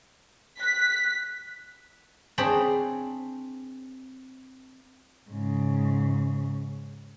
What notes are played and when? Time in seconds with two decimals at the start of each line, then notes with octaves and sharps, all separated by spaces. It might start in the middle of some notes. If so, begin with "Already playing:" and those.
0.60 F#6 B6
2.38 C4 D4 G#4 C5 C#5 B5
5.29 G#2 C#3